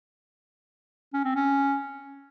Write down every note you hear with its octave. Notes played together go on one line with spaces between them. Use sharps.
C#4
C4
C#4